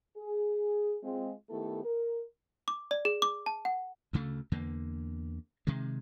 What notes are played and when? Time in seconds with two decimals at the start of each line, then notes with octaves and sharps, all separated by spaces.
0.17 G#4
1.03 G#3 C4 F4
1.50 D#3 A3 B3 E4 G4 A4
1.84 A#4
2.68 D6
2.91 D5
3.05 G#4
3.22 D6
3.46 A5
3.65 F#5
4.13 D2 C#3 A3
4.52 E2 D3 A#3
5.67 C3 D#3 G#3